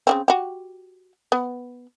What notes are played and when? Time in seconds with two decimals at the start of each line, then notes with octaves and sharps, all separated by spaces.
0.07 C#3 E3 C4
0.28 F#4 G4
1.32 B3